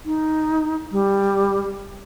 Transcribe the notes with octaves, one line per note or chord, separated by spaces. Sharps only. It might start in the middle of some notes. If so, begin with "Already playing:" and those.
D#4
G3